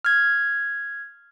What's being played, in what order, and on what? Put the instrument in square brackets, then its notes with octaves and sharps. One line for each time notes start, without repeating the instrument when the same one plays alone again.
[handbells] F6 G#6